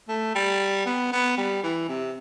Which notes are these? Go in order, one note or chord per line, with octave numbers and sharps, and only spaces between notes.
A3
G3
B3
B3
G3
E3
C3